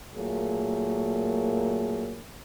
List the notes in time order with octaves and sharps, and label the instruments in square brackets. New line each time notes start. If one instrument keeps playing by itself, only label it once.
[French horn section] A#2 F#3 A3 A#3 G#4